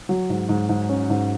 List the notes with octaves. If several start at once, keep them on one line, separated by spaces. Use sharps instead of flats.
F#3
G#2
G#2
G#2
C#4
G#2